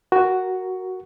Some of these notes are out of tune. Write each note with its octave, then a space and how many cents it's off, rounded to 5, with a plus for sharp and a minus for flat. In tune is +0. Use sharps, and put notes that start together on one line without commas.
F#4 +5 A#4 +0